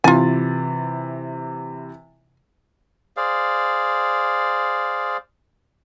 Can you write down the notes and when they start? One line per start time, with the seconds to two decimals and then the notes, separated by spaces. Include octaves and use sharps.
0.04 C3 E3 F4 G#5 A6
3.17 G#4 C5 D5 F5